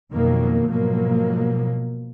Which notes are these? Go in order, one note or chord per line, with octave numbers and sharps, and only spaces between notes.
F2 B2 D#3 F#3 A#3
G#2 B2 F3 F#3 A#3